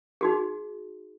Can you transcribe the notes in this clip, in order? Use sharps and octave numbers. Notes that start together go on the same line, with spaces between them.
D#4 F#4 G#4